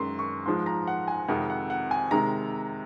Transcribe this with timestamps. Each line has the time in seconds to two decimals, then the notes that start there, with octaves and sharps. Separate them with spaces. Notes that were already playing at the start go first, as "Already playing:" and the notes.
Already playing: F#2 D#3 G#3 C6
0.19 C#6
0.46 G#2 F3 G#3 C6
0.66 A#5
0.87 F#5
1.08 G#5
1.28 F2 C3 D#3 G#3 F#5
1.50 F#5
1.70 F#5
1.91 G#5
2.11 C3 D#3 G#3 A#5